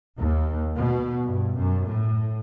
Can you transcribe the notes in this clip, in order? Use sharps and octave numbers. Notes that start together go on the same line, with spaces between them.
D#2
B2
G2
F#2
A2